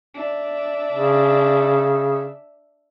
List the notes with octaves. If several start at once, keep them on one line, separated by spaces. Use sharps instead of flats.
D4 E5
C#3